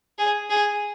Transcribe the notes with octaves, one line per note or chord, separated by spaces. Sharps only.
G#4
G#4